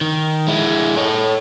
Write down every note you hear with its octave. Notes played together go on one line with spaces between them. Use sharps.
D#3
G#3 E4
A4 C#5